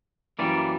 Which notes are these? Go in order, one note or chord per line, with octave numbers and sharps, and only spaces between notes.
F#2 E3 G3 A#3 D5